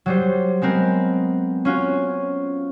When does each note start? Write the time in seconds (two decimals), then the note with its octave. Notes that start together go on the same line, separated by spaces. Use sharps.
0.06 F#3 G3 C5
0.62 G#3 B3 C4 A#4
1.65 C#4 F4 F#4